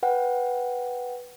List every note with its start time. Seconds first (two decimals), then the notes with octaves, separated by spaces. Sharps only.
0.03 B4 F#5 G5